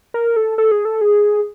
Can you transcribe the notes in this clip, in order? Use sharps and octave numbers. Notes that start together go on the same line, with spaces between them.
A#4
A4
A4
G#4
A4
G#4